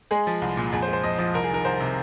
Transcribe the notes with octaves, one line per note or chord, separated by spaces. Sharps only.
G#3 G#4
F3
C2
A#2
F2 G#4
C5
G#3
C5
F2 D#5
F3 D#5
C2 A#4
G#4
D#3 A#4
C2 C5
C3